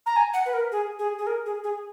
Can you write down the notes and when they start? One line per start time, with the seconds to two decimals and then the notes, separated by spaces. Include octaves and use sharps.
0.06 A#5
0.16 G#5
0.34 F#5
0.46 B4
0.53 A#4
0.72 G#4
0.99 G#4
1.18 G#4
1.27 A#4
1.46 G#4
1.64 G#4